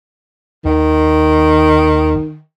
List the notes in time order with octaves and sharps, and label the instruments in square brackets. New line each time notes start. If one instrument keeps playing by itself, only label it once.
[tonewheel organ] D#2 [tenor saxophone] D#3